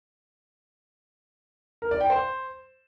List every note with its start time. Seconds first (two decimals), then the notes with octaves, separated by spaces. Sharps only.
1.82 A#4
1.91 D5
2.01 G5
2.10 C5